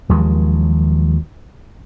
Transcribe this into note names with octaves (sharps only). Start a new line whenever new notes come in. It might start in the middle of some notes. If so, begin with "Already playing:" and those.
D#2 F3 F#3 G#3